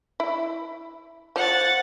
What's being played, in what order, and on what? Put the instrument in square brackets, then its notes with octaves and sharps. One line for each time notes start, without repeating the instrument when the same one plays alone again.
[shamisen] E4
[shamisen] F3 [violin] F#5 A6